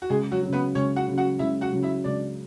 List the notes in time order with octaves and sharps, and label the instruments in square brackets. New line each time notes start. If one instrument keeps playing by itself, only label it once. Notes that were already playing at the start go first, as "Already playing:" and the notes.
[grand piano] F#4
[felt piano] C#2 [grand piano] G#3 G#4
[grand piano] F#3 F#4
[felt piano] C#3 F#3
[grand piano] B3 B4
[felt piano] C#2 [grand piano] C#4 C#5
[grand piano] F#4 F#5
[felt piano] C#3 F#3
[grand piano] F#4 F#5
[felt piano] C#2 [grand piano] E4 E5
[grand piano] F#4 F#5
[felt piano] C#3 F#3
[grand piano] E4 E5
[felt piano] C#2 [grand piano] D4 D5